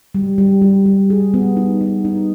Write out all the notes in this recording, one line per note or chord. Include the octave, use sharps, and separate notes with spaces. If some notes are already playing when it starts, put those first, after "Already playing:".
G3
G3
G3
G3
G#4
B3
D#4
D#4
D#4